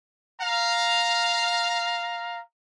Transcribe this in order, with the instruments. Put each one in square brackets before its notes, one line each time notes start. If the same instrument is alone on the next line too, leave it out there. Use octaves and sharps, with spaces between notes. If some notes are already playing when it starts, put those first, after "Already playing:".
[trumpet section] F5 A#5